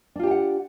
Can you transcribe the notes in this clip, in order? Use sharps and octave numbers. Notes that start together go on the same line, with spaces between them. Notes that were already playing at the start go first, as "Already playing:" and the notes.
D4 F4 G4 F#5 G5